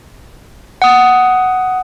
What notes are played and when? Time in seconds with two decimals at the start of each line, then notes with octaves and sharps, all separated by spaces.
0.82 F#5 D#6